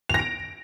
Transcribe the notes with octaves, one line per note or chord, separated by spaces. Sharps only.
A#6 D7 F7